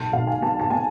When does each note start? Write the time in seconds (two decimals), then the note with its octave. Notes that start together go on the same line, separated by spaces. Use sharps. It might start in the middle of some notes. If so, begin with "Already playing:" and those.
Already playing: B1 A5
0.13 B1 F5
0.27 G#5
0.42 B3 A5
0.60 A5
0.70 B3 G#5